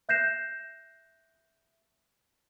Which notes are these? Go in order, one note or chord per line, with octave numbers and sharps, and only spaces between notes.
E5 F#6 G6 A#6 C7 E7